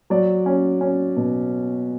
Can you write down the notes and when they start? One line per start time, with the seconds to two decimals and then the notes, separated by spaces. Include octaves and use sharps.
0.10 F#3 D5
0.46 C#4
0.81 C#4
1.17 B2